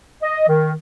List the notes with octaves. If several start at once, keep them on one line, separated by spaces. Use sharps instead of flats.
D#5
D#3